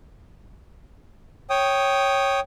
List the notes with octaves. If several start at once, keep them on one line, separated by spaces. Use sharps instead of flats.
C#5 G5 D#6